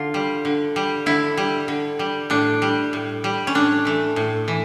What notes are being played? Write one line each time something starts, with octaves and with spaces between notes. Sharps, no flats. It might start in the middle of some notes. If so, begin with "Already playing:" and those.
Already playing: D3 F4
G3
D3
G3
D3 E4
G3
D3
G3
A2 D4
G3
A2
G3
C#4
A2 D4
E3 A3
A2
E3